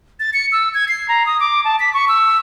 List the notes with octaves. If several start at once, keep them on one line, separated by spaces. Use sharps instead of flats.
A6
C#7
E6
G#6
C7
A#5
D#6
D6
A5
B6
C#6
E6